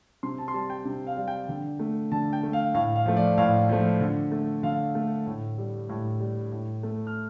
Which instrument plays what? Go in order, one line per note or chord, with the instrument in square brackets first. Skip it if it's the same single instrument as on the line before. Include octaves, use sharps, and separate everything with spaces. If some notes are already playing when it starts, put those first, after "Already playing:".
[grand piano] C3 C6
A5
C6
G3 A5
G5
C3
F5
G3
G5
D3
A3
D3 A5
G5
A3
F5
A2 F5
F5
F3 A3
D5
A2 F5
F3 A3
D3
A3
D3 F5
A3
A2
G3
A2
G3
A2
A3
F6